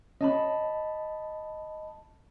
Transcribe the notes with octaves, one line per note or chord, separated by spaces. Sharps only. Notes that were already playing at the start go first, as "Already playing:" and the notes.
C#4 D#5 A5 B5